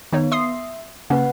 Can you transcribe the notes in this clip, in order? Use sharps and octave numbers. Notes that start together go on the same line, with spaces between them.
D#3 B3 D#4 C#5
E5 C6 D#6 C7
C#3 A#3 C#4 B4 F#5